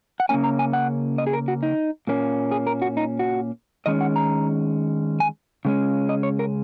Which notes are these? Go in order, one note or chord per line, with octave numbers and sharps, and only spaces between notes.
F#5
C#3 A#3 C#4 G#5
A#5
G#5
F#5
D#5
G#4
A#4
F#4
D#4
A#2 A#3 C#4
G#4
A#4
F#4
D#4
F#4
D#3 G#3 C#4 D#5
F#5
A#5
G#5
C#3 G#3 C#4
D#5
C#5
A#4